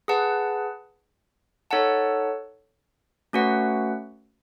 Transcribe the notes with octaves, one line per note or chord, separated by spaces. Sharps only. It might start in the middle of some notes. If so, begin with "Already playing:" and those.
G#4 B4 F#5 A5
D#4 A4 C#5 F#5 A5
A3 C#4 F#4 B4 F#5